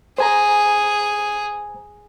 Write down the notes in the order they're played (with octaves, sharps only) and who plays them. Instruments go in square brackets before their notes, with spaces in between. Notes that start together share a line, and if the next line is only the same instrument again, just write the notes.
[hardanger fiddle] G#4 [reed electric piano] C5 G#5 A#5